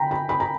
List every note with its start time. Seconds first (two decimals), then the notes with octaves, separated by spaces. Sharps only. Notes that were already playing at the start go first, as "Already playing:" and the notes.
Already playing: G5 A#5 B5
0.11 B5
0.29 B5
0.40 A#5